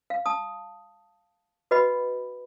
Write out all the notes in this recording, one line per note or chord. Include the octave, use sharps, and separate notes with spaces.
F5
A5 D#6
F#4 B4 D#5 F#5 B5